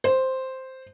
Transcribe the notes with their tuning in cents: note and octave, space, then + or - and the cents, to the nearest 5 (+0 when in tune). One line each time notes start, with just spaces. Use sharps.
C5 +0